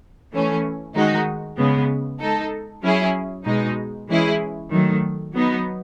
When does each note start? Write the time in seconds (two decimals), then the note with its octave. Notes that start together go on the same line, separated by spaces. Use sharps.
0.32 E3 A3 C#4
0.94 D#3 G#3 D#4 F#4
1.57 C#3 G#3 B3
2.20 G#3 D#4 A4
2.82 F#3 C#4 E4 G#4
3.44 B2 G#3 D#4
4.08 E3 G#3 C#4 E4 G#4
4.70 D#3 F#3 A3
5.32 F#3 B3 D#4